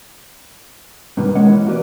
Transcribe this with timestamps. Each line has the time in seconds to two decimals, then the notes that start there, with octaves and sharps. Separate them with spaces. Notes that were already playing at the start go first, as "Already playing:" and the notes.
1.17 G2 B2 D#3 G3 B3
1.35 E2 G#3 A#3 C#4 D#5 F#5
1.48 E3 E4
1.67 A#3 F#4 G4 B4 D5